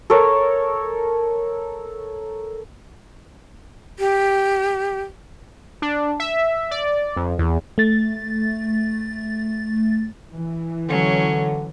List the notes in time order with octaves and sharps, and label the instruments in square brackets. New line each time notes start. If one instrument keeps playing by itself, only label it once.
[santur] A4 A#4 C#5
[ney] G4
[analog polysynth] D4
E5
D5
F2
E2
[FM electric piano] A3 A6
[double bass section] E3
[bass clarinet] D3 [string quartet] F#3 C#4